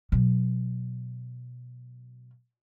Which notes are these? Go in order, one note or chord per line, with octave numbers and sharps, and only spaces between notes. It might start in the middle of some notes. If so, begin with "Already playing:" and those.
B2 F#3